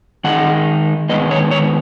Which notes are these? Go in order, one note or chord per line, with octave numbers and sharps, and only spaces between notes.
D#3 G#3 D#4 F#5
D#3 G#3 B3 D#5
C#5
C#5